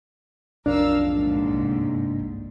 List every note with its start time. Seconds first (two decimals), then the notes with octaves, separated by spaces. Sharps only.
0.66 B1 F2 D4 A#4 F5 E6
1.02 A1 D#2 G#2
1.52 G1 C2